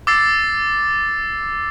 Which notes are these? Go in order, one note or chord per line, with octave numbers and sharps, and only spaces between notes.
D6 E6 A6 C7